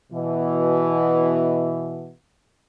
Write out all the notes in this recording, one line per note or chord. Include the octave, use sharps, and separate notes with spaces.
B2 E3